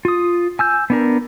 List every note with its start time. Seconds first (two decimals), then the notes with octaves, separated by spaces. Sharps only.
0.05 F4 D#6
0.59 G#5 E6 G6
0.90 B3 D4 A#4